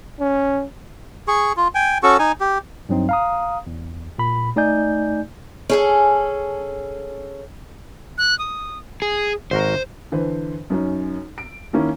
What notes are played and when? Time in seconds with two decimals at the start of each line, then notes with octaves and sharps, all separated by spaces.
0.20 C#4
1.28 G#4 C#6
1.57 F4
1.75 G5 G#5
2.03 C#4 F#4 A4 C#6
2.19 D#4 G#5
2.40 G4
2.89 G2 F#3 C4 D#4
3.09 F5 A#5 D#6
3.67 E2
4.18 A#2 B5
4.56 A3 D#4 D5 G#5 G6
5.69 C#4 G#4 A4
8.18 F#6
8.39 D#6
9.02 G#4
9.51 G#1 F#4 A#4 C5
10.12 D3 E3 B4 C5
10.70 F#2 C#4 D#4
11.38 D7
11.73 D#3 A#3 C#4 E4